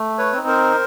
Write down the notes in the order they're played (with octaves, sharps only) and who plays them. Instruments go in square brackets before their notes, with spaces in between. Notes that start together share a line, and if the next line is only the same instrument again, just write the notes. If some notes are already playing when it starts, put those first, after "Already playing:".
Already playing: [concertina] A3
B4 C#5
C4 D#4
A#4 C5